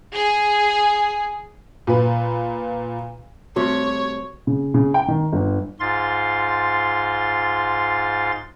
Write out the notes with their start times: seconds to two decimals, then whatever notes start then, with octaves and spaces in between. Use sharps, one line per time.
0.13 G#4
1.87 A#2 B4
3.56 C3 G3 A3 F#4 C#5
4.47 C#3
4.74 C#3
4.94 G5
5.08 D#3
5.33 G1
5.80 G#2 F4 C6 A6